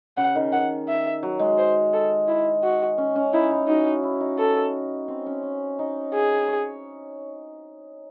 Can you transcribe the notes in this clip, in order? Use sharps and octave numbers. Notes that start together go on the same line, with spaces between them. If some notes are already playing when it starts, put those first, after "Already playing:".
C#3 F#5
D#3
D#3 F#5
E5
F#3
G#3
C5
A4
E4
F#4
C#4
C#4
D#4 E4
E4
D#4 F#4
E4
D#4
A4
C4
C#4
C#4
D#4
G#4
C#5